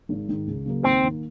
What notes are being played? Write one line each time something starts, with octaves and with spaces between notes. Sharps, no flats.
G#1
G#2 D#3
C#2
C#3 F#3 A#3
D#2 C4
D#3 A#3